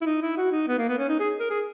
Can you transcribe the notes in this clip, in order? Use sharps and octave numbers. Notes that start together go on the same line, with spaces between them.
E4
D#4
E4
F#4
D#4
B3
A#3
B3
C#4
D#4
G#4
A#4
G#4